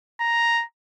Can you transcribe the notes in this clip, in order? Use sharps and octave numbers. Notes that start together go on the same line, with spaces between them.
A#5